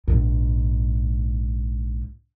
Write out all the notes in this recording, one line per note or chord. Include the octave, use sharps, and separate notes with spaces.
A#1 G#2